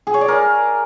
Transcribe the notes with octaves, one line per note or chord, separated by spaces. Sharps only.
G#4
C#5
D5
A#4